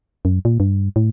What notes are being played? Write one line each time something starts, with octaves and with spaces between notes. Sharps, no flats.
F#2
A#2
G2
A2